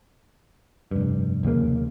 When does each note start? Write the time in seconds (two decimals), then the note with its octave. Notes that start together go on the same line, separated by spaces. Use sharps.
0.91 F1 G2
1.43 F1 D#2 C#3 A#3